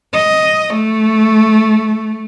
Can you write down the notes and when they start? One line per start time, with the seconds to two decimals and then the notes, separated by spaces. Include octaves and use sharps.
0.13 D#5
0.74 A3